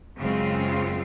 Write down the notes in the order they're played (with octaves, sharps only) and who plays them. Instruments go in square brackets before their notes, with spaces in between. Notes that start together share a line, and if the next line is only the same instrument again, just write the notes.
[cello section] F#2 C#3 G#3 C4 F4